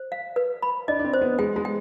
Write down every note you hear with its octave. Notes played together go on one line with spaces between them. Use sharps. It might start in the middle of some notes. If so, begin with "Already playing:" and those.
Already playing: C5
F5
B4
B5
D4 D#5
D4
C4
C5
B3
G#3 G5
G#3
G5